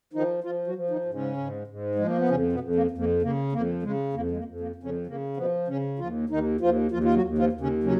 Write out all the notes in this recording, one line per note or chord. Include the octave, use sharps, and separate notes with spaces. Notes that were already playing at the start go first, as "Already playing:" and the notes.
D#3 F3 D#4
F3 F4
F#3 F#4
F3
D#3 D#4
G#2
C#3 C#4
G#2
G#2
F3 G#3
A#3
B3
F2 C#3 C#4
B2 B3
F2
A#3
F2
A#3
C#3 A#3
F2 A#3
C#3 G#3
F2 A#3
G#3
A#3
F2
A#3
F2
C#3 C#4
C#3 A#3
B2 F3 B3
C#3 C#4
D#2 F3 F4
D#2 D#3 D#4
D#2 F3 F4
D#2 F3 F4
F4
F#3 F#4
D#2
F3 F4
D#2
C#3 C#4
C#3 F#3 C#4